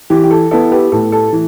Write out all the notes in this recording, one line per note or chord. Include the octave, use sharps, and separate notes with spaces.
E3 G4
G4
A4
B3 E4 A4
G4 B4
A2 A4
A4
E3